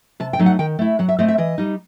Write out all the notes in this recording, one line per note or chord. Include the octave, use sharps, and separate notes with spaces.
C3 A5
G5
F#3 A3 D#4
F#5
D#3 G5
A3 E4
F#3 F#5
E5
A3 C4 D#5
E5
E3 D#5
G3 D#4